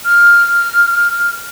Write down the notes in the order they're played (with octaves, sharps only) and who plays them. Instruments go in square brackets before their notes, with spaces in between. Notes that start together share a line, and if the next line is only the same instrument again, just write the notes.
[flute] F6